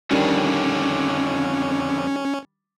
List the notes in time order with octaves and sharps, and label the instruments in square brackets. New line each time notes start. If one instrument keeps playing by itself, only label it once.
[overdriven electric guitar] F2 D3 [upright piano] D#3 G3 D4 [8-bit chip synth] C#4